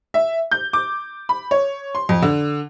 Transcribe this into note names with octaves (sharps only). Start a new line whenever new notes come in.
E5
G6
D6
B5
C#5
C6
F2
D3